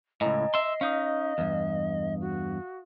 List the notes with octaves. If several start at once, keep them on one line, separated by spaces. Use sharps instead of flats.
C#2 A2 E4 D#5 G#5 A#5
D#5 E5 C6 C7
C#4 D#4 F5 D#6
E2 G2
F#4